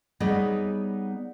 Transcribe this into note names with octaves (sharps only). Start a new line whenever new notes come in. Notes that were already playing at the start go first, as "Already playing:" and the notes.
G3 B3 D#4 G#4 C#5 D#5